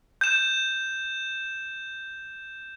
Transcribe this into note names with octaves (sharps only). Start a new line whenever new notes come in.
G6 E7